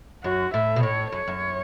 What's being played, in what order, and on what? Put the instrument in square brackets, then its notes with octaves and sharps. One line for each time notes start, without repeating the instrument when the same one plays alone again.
[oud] F#2 [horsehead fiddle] F#4
[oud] A2 [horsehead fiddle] E5
[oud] B2
[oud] A2 [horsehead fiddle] C#5
[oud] F#2 [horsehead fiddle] C#5
[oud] F#2